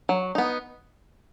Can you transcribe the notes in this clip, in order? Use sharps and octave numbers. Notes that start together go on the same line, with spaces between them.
F#3
B3 D#4